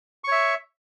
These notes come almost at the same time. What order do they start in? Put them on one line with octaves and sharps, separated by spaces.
C#6 C#5 E5